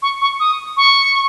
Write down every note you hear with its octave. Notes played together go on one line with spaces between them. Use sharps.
C#6
C#6
D#6
C#6